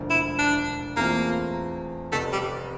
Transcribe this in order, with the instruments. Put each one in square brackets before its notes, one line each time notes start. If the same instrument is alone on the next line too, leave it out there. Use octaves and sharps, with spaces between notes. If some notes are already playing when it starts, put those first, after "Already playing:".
Already playing: [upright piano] E1 D2 D3 F3
[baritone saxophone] E4
D4
[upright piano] E2 E3 A3 C4 F4 [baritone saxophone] A#3
[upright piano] F1 F2 C3 [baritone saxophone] A3
[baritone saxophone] G3